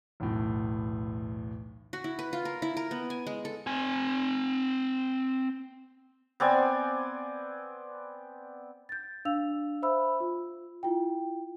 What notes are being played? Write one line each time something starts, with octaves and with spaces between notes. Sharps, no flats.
B1 E2 A2
F#4
E4
B4
F4
A#4
E4
A#4
B3
G#5
G#3
A4
C4 G#5
B3 C4 D5 G#5
G6 A6
D4 F5 E6 F7
C5 E5 B5 E6
F4
E4 F4 G5